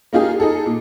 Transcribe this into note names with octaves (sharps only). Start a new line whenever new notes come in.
A#3 D#4 F4 G4 G#4
D#4 G#4 A4
A#2